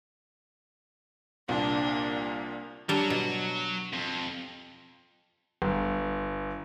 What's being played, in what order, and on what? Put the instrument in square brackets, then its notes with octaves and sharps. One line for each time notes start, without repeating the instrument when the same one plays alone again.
[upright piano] C2 A#2 [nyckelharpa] A#3 [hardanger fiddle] D4
[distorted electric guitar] F#3 [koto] G3 D4
[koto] B2
[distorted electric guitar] F2
[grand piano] G1